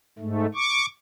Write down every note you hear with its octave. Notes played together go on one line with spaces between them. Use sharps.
G#2 A3
C#6 D6